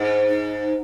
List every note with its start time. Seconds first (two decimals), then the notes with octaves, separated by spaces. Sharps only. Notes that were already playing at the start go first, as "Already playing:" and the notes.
Already playing: G#2
0.29 D#4